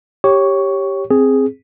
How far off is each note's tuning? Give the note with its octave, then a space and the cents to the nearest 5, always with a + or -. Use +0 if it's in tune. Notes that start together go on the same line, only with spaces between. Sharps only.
G4 +0 C#5 -10 C#6 +10
C4 +5 G#4 +0